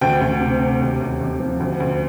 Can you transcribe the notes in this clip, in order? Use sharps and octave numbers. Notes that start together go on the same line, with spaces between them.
D2 G5
D2
C3
C3
D#2
D#2
D#2
F3
D2
D2